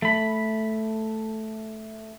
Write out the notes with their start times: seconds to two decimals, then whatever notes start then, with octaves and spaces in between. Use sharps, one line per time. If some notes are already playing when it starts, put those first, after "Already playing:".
0.02 A3 B5